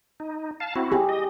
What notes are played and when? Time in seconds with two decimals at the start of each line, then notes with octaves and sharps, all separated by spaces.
0.20 D#4
0.60 F5 A5
0.76 C4 E4 F#4
0.92 G4 G#4
1.09 D#5